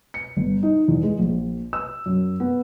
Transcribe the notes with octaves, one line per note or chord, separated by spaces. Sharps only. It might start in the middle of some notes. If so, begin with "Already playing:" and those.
C#7
G1
D#4
E2
G#3
A#1
E6
F#2
B3